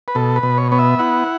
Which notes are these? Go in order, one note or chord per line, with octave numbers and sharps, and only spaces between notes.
B4
B2 A4
B4
B2
C#5
B3 C#5
E5
E4 F#5